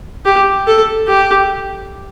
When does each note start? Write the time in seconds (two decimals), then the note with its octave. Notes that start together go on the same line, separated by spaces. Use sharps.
0.25 G4
0.67 A4
1.08 G4